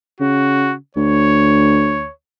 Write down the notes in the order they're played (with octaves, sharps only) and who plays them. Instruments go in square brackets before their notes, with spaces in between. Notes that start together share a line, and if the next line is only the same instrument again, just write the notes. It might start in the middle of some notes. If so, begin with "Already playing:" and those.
[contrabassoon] C#3 [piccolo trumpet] F#4
[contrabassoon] D2 [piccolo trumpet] C#5